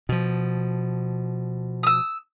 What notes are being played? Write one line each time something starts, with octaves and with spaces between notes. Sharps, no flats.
B2 F3
D#6 E6